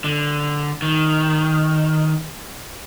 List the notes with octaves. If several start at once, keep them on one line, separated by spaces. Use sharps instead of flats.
D3
D#3